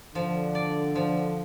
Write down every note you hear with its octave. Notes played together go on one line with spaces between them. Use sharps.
D3 F3
D5
F3